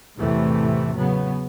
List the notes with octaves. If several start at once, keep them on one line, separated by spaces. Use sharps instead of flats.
E2 A2 C3 E3 A3
C#3 F#3 B3